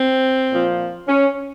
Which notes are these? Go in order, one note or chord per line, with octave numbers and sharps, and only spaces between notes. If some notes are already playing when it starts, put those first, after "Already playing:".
Already playing: C4
A#2 F3
C#4